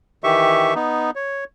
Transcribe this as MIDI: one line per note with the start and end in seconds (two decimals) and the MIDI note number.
0.24 0.74 51
0.24 0.74 52
0.24 0.74 67
0.24 0.74 76
0.24 0.74 85
0.75 1.10 59
0.75 1.10 63
1.16 1.44 73